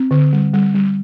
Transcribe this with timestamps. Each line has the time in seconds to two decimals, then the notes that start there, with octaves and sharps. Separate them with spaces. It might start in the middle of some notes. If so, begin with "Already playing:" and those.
Already playing: C4
0.11 D3
0.33 G3
0.54 G3
0.75 G3